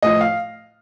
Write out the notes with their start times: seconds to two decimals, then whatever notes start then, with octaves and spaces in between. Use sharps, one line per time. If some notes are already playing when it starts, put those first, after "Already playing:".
0.02 A2 F3 D#5
0.21 F5